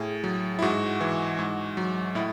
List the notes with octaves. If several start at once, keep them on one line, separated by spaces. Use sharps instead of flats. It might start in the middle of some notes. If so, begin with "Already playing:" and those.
Already playing: A2 G#4
F#3
E4
G#2 F#4
E3
G#2
F#3
A2 E4